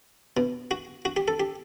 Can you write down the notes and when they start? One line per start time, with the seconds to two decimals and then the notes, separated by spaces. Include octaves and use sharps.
0.37 B2
0.71 F#4
1.05 F#4
1.17 G4
1.28 A4
1.40 G4